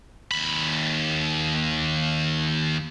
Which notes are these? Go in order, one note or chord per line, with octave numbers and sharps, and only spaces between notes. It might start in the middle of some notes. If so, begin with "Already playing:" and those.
D#2 B5